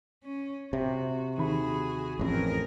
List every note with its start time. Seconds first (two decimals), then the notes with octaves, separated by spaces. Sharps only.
0.24 C#4
0.73 C3 F#4
1.38 D#2 F#4 G#4 B5
2.19 A1 F2 G#4 A#4